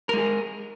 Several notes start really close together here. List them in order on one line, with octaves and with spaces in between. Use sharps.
A#4 G#3 G#4